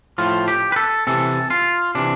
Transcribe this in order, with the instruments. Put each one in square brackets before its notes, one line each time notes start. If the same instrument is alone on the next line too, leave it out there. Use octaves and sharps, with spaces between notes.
[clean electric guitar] A2 F3 F4
G4
B4
A4
C3 E3 A4
F4
C3 E3 D4